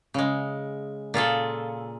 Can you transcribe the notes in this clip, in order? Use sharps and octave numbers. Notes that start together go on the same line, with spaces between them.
C#3 G#3
A#2 F4 G#4 A4